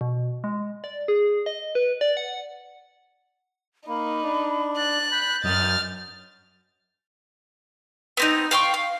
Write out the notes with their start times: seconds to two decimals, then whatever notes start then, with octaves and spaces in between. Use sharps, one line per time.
0.01 B2
0.44 G#3
0.84 D5
1.08 G#4
1.46 D#5
1.75 B4
2.01 D5
2.17 F#5
3.88 A#3 D#4 B5
4.23 D4
4.77 F#6 A6
5.12 B5 G6
5.44 F#2 D#5 F6 A6
8.17 B3 C4 D#4
8.51 F5 G5 C6 C#6
8.74 F5